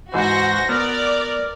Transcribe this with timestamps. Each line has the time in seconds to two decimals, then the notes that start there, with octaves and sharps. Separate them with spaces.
0.14 G#2 E3 F#4 C5 A#6
0.69 B3 A#4 D5